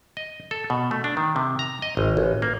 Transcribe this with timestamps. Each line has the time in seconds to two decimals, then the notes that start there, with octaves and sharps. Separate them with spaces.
0.17 D#5
0.51 A4
0.70 B2
0.91 A3
1.04 D4
1.17 D#3
1.36 C3
1.59 A#5
1.82 D#5
1.97 G#1
2.17 A1
2.42 A#3